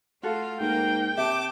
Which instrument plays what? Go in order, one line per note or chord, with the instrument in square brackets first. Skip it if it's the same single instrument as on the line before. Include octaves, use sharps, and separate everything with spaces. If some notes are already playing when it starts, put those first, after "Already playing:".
[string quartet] A3 F4 [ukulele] F#4 A4 [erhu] F5
[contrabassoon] G#2 [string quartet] A#3 A#4 [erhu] G5
[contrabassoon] C3 [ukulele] E5 [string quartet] A5 D6